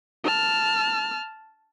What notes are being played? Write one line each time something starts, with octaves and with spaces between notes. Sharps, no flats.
A5 F6